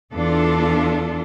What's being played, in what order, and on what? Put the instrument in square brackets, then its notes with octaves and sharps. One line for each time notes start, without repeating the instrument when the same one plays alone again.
[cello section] E2 D4 F4 A4